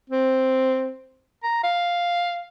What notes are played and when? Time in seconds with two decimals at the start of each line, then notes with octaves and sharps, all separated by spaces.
0.10 C4
1.44 A#5
1.64 F5